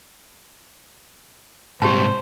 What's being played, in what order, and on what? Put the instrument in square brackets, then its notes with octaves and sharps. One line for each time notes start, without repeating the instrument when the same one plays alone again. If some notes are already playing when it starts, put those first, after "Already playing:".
[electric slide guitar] G#2 C3 G3 [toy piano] G4 A5 [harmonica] C5